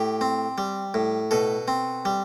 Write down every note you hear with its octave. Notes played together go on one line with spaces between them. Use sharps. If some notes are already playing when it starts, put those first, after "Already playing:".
Already playing: A2 G4
C4
G3
A2
B2 A4
C4
G3